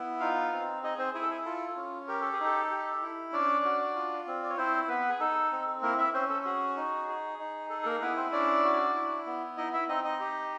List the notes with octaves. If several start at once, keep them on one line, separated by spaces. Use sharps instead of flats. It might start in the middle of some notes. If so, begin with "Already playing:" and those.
Already playing: B3 E4
D#4 F4 F5
C4
D#4 G#4 D#5
C4 C5
E4 G#4
A4
G#4
F4 A4
C#4
G4 A#4
A4
G#4
D#4
A4
G4
E4
C#4 D4 D5
F#4
F4
C4
D5
C#5
C4 E4 C5
B3 B4
G#4
D#4 A4
C4
A#3 E4 A#4
E4 E5
C4 C#4 C5
A4
F#4 G#4
D#4
G#4
D#4
G#4 A4
A4
A#3 A#4
B3 E4 B4
C4 C5
C#4 D4 D5
F#4
E4
B3
D#4 E4 D#5
E4 E5
C4 D#4 D#5
D#4 D#5
G4